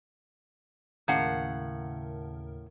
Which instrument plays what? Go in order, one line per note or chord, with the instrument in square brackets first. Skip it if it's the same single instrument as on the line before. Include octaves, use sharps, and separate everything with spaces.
[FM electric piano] D#2 C#3 A#4 [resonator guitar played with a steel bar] A2 F5 F#5